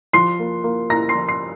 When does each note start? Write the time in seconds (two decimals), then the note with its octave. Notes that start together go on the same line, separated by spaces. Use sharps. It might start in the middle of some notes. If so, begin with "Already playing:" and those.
0.13 F3 C6 C7
0.39 A#3
0.64 A#3
0.90 A#3 A#5 A#6
1.09 C6 C7
1.15 F3
1.28 C6 C7